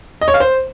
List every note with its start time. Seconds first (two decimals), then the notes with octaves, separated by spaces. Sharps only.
0.21 D#5
0.28 C#5
0.34 F5
0.40 C5